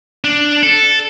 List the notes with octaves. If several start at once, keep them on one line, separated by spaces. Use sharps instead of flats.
D4
A4